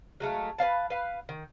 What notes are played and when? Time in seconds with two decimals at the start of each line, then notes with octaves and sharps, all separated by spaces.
0.20 F#3 G#3 A3 F5
0.58 B4 D5 F5 A5
0.90 B4 F5
1.29 D#3